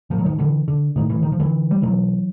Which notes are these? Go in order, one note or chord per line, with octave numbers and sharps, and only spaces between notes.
A2 F3
F#3
D#3 F3
D3 E3
D3
A2 D#3
E3
D#3
F3
D3 E3
G3
B2 E3 F#3